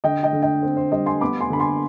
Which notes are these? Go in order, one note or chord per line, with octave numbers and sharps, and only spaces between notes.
D3 D#5 G5
D#5 G5
D3
D#5 G5
C4
C5
G3 C5 D#5
G#5 C6
B3 B5 D6
G#5 C6
D3 B5
G#5 C6